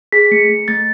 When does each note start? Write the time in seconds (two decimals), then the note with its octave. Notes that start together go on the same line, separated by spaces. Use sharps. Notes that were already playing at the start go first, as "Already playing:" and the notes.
0.12 G#4 B6
0.31 A3 C#7
0.49 A3
0.68 A3 A6